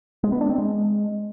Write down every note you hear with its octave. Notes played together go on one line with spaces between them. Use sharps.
G#3
B3
D4
C4
G#3